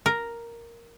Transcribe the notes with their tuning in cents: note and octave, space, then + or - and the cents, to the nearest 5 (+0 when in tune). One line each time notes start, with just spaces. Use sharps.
A#4 +0